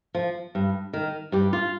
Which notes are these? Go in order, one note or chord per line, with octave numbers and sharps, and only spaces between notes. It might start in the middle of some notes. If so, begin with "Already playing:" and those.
F3
G2
D#3
G2 G4
F4